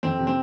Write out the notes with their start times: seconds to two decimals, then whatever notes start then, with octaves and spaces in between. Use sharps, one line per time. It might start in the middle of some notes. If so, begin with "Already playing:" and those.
0.03 F2 C4
0.19 C3
0.27 C4